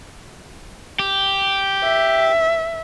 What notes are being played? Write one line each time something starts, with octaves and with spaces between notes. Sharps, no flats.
G4
E5